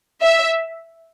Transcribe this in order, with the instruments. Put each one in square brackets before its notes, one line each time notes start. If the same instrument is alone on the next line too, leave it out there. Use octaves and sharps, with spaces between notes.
[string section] E5